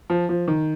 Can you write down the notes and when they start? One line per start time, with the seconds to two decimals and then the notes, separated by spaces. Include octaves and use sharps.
0.10 F3
0.29 F3
0.48 D#3